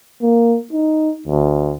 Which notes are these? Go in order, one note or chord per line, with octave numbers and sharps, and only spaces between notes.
A#3
D#4
D2